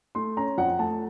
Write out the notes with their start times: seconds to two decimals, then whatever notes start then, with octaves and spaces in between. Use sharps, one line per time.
0.15 A3 C6
0.37 C#4 A#5
0.58 F2 F#5
0.79 A3 A5